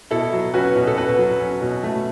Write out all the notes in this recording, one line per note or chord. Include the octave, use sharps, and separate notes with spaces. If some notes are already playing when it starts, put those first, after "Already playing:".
B2 E4 A4
F#3
C#4 F#4 B4
B2
A4
B2 F#4 B4
F#3
C#4
B2
A3